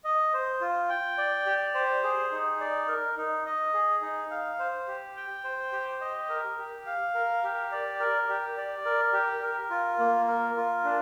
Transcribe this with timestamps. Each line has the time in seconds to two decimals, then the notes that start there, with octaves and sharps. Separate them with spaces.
0.04 D#5
0.33 C5
0.61 F4
0.89 G5
1.18 D5
1.46 G4
1.75 C5
2.04 G#4
2.32 D#4
2.61 D5
2.88 A#4
3.17 D#4
3.46 D#5
3.74 G#4
4.02 D#4
4.31 F5
4.59 C5
4.87 G4
5.17 G5
5.44 C5
5.72 G4
6.01 D#5
6.29 A#4
6.58 G4
6.86 F5
7.14 A#4
7.44 G4
7.72 D5
8.00 A#4
8.29 G4
8.57 D5
8.85 A#4
9.13 G4
9.43 A#4
9.70 F4
9.99 A#3
10.27 A#4
10.56 F4
10.84 D4